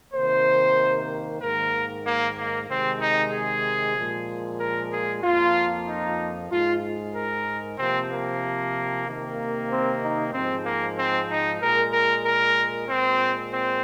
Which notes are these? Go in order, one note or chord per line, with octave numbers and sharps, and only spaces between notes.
C3 D#3 A#3 C5
G#2 D#3 A#3 A#4
A#3
A#3
C3 D#3 G#3 C4
D#4
G#4
A#2 F3 G#3
A#4
G#4
F2 F3 A#3 F4
D#4
G#2 G#3 F4
A#4
C3 F3 A#3 C4
A#3
C3 D#3 A#3
C4
D#4
G#2 F3 G#3 C4
A#3
C4
D#4
A#2 G#3 A#4
A#4
A#4
A#2 G#3 C4
C4